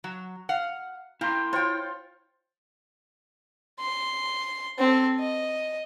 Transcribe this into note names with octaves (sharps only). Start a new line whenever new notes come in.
F#3
F5 F#5
A#3 E4 F5 G5 C6
F4 C5 C#5 G5
C6
C4 A4
D#5